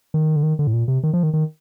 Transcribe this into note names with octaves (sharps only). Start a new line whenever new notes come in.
D#3
D3
D#3
D3
A2
A#2
C3
D#3
F3
D#3
D#3